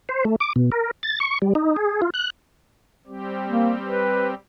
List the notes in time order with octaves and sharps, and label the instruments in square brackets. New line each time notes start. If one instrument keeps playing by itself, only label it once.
[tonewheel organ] C5
A3
D6
B2
A#4
A6
C#6
G3
D#4
G#4
F4
F#6
[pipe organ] G3 C4 G4
[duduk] A#3
B4